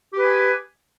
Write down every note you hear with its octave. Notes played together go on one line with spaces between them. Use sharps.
G4 G#4 B4